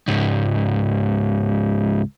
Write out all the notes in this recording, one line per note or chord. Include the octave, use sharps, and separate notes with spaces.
C#2 G#2